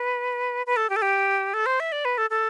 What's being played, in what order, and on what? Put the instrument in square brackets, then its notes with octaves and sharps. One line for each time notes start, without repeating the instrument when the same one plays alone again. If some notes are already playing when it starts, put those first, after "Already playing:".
Already playing: [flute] B4
B4
A4
G4
A4
G4
A4
C5
E5
D5
B4
A4
A4